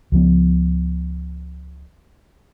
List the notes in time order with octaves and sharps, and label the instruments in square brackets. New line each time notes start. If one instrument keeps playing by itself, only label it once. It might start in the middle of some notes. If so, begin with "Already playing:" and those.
[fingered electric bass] C#2 F3 B3